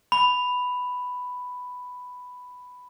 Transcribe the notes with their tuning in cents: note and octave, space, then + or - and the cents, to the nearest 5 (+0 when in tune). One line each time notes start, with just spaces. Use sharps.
B5 +5